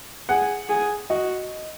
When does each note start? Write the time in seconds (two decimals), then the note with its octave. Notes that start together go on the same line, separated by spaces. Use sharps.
0.29 G#4 F#5
0.69 G#4
1.10 F#4 D#5